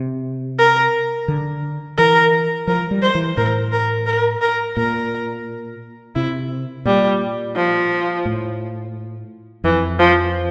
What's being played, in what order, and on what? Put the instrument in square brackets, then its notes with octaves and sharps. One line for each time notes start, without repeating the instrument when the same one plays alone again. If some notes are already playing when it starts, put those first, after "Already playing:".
Already playing: [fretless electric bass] C3
[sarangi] A#4
[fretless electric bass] D3
[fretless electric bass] E3 [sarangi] A#4
[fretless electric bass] F3 [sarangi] A#4
[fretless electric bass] G3
[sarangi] C5
[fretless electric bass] E3
[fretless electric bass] A2 [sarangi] A#4
[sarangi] A#4
A#4
A#4
[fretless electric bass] A#2 [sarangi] A#4
[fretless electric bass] C3 [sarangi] E4
[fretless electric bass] A#2 [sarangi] G3
[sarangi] F3
[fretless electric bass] A2
[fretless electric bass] F2 [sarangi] E3
[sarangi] F3